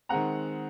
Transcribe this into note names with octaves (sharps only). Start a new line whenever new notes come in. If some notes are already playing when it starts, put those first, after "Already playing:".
D#3 G#3 C4 F#5 A#5